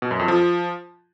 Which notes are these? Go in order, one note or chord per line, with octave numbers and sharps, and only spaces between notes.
B2
F#2
F2
F3